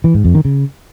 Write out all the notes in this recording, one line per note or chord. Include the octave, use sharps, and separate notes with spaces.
E3
G#2
F2
D#3
C#3